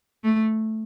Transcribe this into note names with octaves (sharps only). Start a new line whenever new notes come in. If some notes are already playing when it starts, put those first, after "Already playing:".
A3